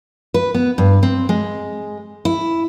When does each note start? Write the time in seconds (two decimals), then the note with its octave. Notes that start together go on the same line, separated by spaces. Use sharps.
0.34 B4
0.54 B3
0.78 G2
1.03 C4
1.29 G#3
2.25 E4